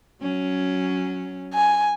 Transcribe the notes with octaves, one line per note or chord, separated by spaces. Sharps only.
F#3 C#4
G#5